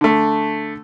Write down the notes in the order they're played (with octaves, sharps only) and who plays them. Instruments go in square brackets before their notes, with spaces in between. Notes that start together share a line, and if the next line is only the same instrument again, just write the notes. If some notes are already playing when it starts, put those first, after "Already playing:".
[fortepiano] D3 A3